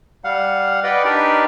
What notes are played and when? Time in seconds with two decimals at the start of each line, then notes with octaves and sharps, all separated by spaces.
0.24 G3 F5 F#5
0.84 B4 D5 D#5 F#5 G5
1.05 D4 D#4 G4 A#4 B4 D5